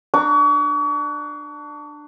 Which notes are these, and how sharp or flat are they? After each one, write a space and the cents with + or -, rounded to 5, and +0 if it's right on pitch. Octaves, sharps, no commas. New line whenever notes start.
D4 +20 A#5 +0 C#6 +40